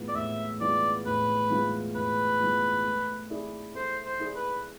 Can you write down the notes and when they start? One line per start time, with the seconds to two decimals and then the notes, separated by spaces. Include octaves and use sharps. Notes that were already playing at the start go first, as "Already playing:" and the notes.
Already playing: A2 E3 G#3 B3 F4
0.08 D5
0.15 A2 E5
0.61 E3 G#3 B3 F4 D5
1.06 A2 B4
1.50 E3 G#3 B3 F4
1.95 A2 B4
2.40 E3 G#3 B3 F4
2.85 A3
3.30 E4 G#4 D5
3.75 A3 C5
4.05 C5
4.20 E4 G#4 D5
4.36 B4